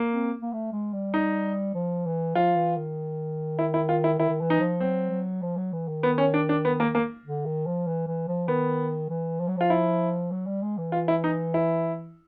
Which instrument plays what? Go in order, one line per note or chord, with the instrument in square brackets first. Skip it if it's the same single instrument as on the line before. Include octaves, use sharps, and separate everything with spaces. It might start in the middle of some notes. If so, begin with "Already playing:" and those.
Already playing: [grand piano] A#3
[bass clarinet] C4
A#3
A3
G#3
G3
[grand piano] D#4
[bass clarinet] F3
E3
[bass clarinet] F3 [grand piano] F4
[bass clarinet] E3
D#3
[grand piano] E4
E4
F4
E4
[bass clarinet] D#3 [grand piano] E4
[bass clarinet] D#3
E3
[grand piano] D#4
[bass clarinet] F3
[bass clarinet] F#3 [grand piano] C4
[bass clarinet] F#3
F3
F#3
E3
D#3
[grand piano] B3
C#4
D4
D4
B3
A#3
A#3
[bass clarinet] D3
D#3
F3
E3
E3
F3
[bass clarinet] D#3 [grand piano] B3
[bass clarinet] E3
F3
F#3
[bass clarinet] F3 [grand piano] F4
[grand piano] E4
[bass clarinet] F#3
G3
G#3
E3
[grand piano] F4
E4
D#4
E4